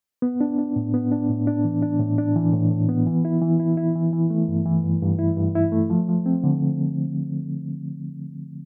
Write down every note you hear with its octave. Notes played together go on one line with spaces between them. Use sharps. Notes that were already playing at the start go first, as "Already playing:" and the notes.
B3
D4
D4
A2
B3
D4
A2
D4
E3
D4
A2
D4
E3
A2
A2
B3
E3
E4
E3
E4
E4
E3
E3
A3
G2
E3
G2
G2
E4
G2
E4
A3
F3
F3
C4
D3